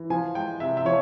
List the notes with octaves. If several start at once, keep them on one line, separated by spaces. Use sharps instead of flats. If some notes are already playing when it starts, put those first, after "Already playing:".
Already playing: E3
F3 G#5
G#3 G5
C3 E5
E5
F3 C#5